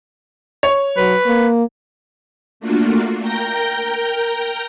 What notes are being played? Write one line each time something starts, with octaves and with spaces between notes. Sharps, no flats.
C#5
F#3 B4
A#3
A3 A#3 D4 F4 F#4
A#4 G5 A#5 G6 A#6